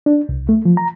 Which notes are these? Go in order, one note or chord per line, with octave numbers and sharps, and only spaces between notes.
D4
C2
A3
F3
A#5